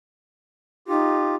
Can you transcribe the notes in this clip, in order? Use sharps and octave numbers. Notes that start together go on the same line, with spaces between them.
D#4 F4 G4